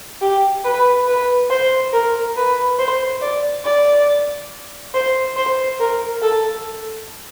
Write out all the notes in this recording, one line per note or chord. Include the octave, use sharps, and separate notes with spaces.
G4
B4
B4
C5
A#4
B4
C5
D5
D5
C5
C5
A#4
A4